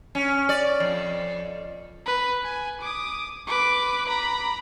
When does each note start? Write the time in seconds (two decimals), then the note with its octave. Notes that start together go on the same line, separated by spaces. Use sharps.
0.15 C#4
0.49 D5
0.80 F2
2.06 B4
2.43 G#5
2.80 D6 D#6
3.47 B4 D6
4.07 A#5 B5